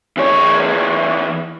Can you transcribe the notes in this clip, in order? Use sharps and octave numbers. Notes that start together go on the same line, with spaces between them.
E2 C#5